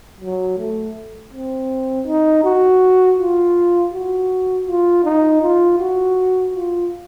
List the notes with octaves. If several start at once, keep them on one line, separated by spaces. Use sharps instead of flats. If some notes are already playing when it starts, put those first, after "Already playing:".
F#3
A3
C4
D#4
F#4
F4
F#4
F4
D#4
F4
F#4
F4